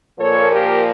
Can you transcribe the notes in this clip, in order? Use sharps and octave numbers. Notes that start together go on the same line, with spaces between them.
A#2 F3 A#3 A4 C#5
G4 A#4